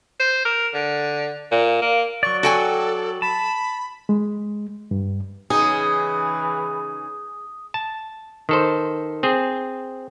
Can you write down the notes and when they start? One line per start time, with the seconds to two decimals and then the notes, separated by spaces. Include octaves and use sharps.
0.20 C5
0.45 A#4
0.74 D3
1.52 A#2
1.82 A#3
2.23 F#3 D5 C#6
2.43 F#4 A4 G5 G#5
3.22 A5 B5
4.09 G#3
4.91 G2
5.50 C#3 E3 D#4 G#4 D#6
7.74 A5
8.49 D#3 A4 C5
9.23 C4 G#4